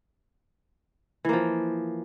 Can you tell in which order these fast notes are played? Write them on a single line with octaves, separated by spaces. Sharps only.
E3 A#3 F3